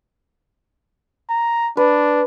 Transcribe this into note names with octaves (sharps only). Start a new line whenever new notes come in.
A#5
D4 B4